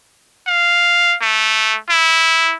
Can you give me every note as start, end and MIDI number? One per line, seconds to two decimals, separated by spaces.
0.47 1.15 77
1.22 1.77 57
1.90 2.55 64